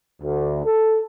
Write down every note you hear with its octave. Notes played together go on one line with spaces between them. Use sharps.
D2
A4